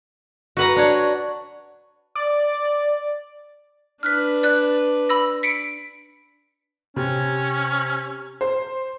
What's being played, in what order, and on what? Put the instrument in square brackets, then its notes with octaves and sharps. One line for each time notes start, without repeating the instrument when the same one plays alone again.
[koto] F#4 B4 A#5
D4 C#5
[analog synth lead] D5
[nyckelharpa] D4 B4 [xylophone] F6 F#6 B6
[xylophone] D5 F#6
B5 E6 A#6
B6 C#7 D7
[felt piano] C3 [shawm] C#4
[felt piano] C5